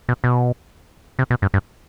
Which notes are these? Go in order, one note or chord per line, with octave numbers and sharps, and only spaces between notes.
B2
B2
C3
B2
G2
G2